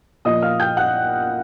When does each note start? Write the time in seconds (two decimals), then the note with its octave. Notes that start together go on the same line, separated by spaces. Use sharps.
0.25 A#2 F3 A#3 D#5 D#6
0.42 F5 F6
0.60 G5 G6
0.77 F#5 F#6